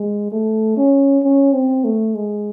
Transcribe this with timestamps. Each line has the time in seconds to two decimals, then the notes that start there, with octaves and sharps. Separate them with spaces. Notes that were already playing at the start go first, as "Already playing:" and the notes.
Already playing: G#3
0.32 A3
0.77 C#4
1.24 C#4
1.53 C4
1.84 A3
2.15 G#3